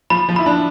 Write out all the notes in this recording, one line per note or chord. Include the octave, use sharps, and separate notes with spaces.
F3 B5
F3
E4 B5
D4